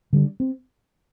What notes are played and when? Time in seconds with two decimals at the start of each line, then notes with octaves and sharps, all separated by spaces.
0.13 D3 G3 D4
0.40 C4